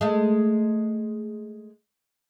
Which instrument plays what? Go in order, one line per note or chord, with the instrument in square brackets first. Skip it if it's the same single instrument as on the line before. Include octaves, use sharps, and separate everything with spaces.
[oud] G#3 A3